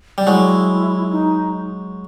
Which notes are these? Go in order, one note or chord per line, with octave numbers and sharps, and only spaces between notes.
G3
F#3 G#3 E4
D#4